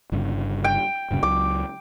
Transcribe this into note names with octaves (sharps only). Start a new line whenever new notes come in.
G1 G2 C#3
G5
D#1 G2 C#3
C#2 F#3 D6